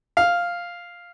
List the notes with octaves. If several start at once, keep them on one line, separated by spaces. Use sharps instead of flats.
F5